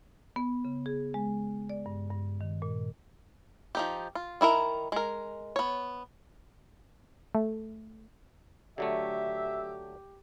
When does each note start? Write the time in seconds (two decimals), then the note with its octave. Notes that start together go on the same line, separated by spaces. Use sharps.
0.36 B3
0.65 C#3
0.86 G#4
1.14 G#3
1.70 D5
1.86 G2
2.11 G2
2.41 D#3
2.62 A#2
3.75 F3 D#4 G4
4.15 F4
4.41 D#3 E4 F#4 A#4
4.92 G#3 A#4
5.56 B3 C#5
7.35 A3
8.78 D3 F#3 A3 G4 E5